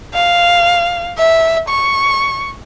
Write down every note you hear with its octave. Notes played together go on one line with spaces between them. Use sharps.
F5
E5
C#6